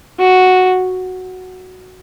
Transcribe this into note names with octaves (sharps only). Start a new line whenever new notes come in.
F#4